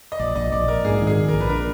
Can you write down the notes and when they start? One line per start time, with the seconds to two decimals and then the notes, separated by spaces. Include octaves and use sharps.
0.12 D#5
0.20 A#1 D5
0.36 A#1 D#5
0.52 A#1 D5
0.68 A#1 A#4
0.85 G#2 G#4
1.02 D#3
1.07 G#4
1.18 A#1
1.28 A#4
1.34 A#1
1.40 B4
1.50 D4 A#4